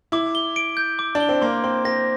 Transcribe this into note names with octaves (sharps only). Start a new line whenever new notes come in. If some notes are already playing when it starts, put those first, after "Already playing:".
E4 D6
G7
D7
G6
D6
D4
G7
C4
A#3 C6
C4 C6
C4 A#6